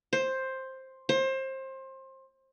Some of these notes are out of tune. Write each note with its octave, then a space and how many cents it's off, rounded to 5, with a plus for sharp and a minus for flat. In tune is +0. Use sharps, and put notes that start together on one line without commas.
C5 +10
C5 +25